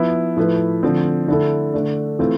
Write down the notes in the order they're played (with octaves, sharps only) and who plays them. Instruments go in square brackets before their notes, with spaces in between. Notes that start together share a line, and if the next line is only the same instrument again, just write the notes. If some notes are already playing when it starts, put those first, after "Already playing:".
Already playing: [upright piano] F3 B3 E4
A2 F3 A3 E4 B4
D3 F3 A3 C4
D3 A3 E4 A4
D3 A3 D4
E3 A3 C4 F4